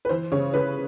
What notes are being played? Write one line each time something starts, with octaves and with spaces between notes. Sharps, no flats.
B4
E3 C5
C#3 C#5
C#3 B4